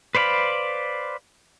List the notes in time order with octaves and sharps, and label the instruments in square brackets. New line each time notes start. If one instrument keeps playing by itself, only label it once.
[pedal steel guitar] B4 C5 D5 F5 B5